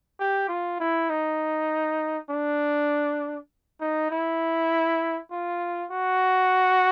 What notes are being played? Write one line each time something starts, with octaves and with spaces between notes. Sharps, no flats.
G4
F4
E4
D#4
D4
D#4
E4
F4
F#4